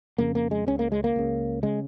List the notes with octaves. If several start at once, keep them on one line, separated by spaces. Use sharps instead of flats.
F2 C#3 A#3
A#3
G#3
C#2 C#3 C#4
A#3
G#3
A#3
C#2 C#3
C#3 G#3